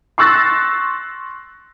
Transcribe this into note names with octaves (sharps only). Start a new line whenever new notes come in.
C6 C#6 E6 F#6 A6 A#6